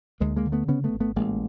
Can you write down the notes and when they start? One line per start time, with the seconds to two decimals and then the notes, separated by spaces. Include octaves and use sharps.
0.20 D2 G#3 A#3
0.36 G#3 A#3
0.45 D3
0.52 A3 B3
0.68 C#3 B3 C#4
0.84 A3 B3
0.93 G#1
1.00 A3 B3
1.16 A1 G#3 A#3